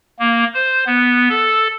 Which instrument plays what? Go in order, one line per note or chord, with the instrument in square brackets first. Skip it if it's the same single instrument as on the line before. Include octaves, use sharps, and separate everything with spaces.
[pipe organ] A#3
C5
B3
A4